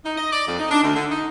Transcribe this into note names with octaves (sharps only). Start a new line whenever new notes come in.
D#4
D#5
D5
F2
D#4
D4
D2
D3
D#4